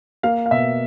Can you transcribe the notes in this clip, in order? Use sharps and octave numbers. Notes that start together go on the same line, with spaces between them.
A#3 F5
F5
B2 E5